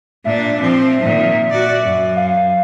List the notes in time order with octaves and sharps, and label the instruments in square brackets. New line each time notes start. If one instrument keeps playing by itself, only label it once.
[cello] A#2 D4 [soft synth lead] E5
[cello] F3 C4
A#2 D#3
F#4 D5
F#2
[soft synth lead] F5